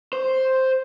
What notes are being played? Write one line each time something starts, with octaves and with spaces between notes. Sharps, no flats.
C5